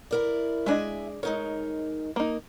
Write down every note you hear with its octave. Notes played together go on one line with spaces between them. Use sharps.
E4 A#4 D5
G#3 D4 D#5 E5 G#5
G#3 D#4 A#4 C#5
A#3 D#4